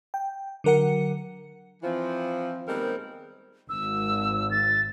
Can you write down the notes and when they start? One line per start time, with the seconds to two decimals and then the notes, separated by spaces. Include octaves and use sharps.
0.14 G5
0.64 D3 F#3 A#4 F#5 C#7
1.83 E3 F3 C4
2.67 D#2 G3 G#3 B3 C4 A#4
3.69 G#1 E6
4.51 A6